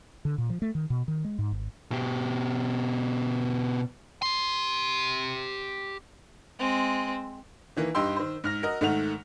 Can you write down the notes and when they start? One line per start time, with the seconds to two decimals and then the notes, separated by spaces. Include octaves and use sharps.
0.25 D3
0.38 A#2
0.50 F3
0.62 A3
0.75 D#3
0.90 B2
1.08 D#3
1.25 G#3
1.39 G#2
1.52 G#1
1.91 B2 G4
4.22 G4 C6
6.59 G#3 C4
7.77 D#3 E3 A#3
7.95 G2 D#4 G4 G5 C6 E6
8.16 D#3 C5
8.44 G#2 F6 A#6
8.62 F#4 A#4 D#5
8.81 G#2 D#3 A3 F#5 F7